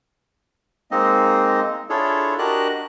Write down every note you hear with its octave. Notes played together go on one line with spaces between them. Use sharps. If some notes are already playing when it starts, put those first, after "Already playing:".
G#3 A#3 C4 D#4 D#5
D4 E4 F4 G#4 A4 C#5
D4 F#4 G4 A#4 D#5 F#6